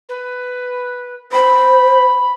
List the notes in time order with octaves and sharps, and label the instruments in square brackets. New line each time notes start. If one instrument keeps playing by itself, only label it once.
[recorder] B4
[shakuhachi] C5 [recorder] B5